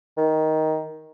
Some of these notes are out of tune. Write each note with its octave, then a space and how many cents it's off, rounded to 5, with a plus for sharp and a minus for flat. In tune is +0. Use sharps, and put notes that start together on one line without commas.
D#3 +10